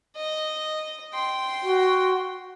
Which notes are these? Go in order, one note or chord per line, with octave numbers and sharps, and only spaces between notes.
D#5
G5 C6
F#4